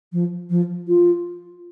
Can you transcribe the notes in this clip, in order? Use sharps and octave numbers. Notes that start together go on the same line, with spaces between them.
F3
F3
F4